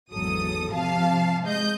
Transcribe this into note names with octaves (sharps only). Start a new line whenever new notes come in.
G#1 E2 F#3 A4 D#6
C3 F3 F5 A5
G#3 D#5 G6